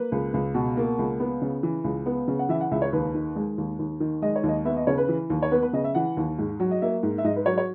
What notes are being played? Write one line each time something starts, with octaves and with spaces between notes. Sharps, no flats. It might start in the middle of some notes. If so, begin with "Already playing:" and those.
Already playing: A#3 B4
C#2
C#2
B2
A#3
C#2
B3
C#3
E3
C#2
B3
C#3
F#5
E3 E5
F#5
C#2 E5
C#5
D#2 B4
D#3
G#3
D#2
D#2
D#3
G#3 D#5
C#5
D#2 D#5
B3 E5
D#5
C#3 C#5
B4
E3
D#2
C#5
B3 B4
B4
C#3 D#5
E5
E3 F#5
D#2
G#2
F#3
D#5
A#3 E5
G#2
E5
G#2 D#5
B4
F#3 C#5
C#5